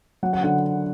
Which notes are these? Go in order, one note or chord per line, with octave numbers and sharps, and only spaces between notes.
F#3 F#5
F#5
D3 F#5